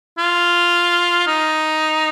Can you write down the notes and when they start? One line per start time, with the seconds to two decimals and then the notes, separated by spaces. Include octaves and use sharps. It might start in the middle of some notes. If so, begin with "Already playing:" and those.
0.18 F4
1.27 D#4